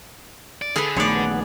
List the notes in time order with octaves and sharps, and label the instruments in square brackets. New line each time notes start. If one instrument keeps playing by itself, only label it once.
[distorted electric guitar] D5
[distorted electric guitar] D3 [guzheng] G#4 B4 [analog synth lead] A4
[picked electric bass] A#1 D#3 A3 [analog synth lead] B3 [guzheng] C#5 D5